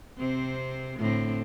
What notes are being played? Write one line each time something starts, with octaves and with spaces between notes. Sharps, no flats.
C3 C4
A2 D3 C4